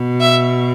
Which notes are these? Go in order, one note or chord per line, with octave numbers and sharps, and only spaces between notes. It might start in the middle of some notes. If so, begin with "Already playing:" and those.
Already playing: B2
E5